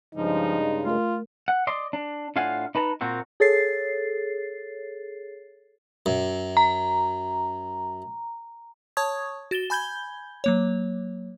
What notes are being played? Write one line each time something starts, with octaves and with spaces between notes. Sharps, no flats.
G2 C#3 F3 G#3 D#4
A3 F4 A#4
F#5
D5 D#5 C6
D4
A2 D4 F4 F5 F#5 G#5
D#4 B4 A5 A#5
A#2 A#3 C4 F#4
G#4 A4 C#5 A6 C7
F#2
A#5
C#5 A5 C#6 D#6 G#6
F#4 A6 E7 G7
G#5 B5 G6 G#6 G7
F#3 A#3 C#5